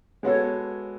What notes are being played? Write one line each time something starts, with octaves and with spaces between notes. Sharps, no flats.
G#3 B3 F#4 A4 C#5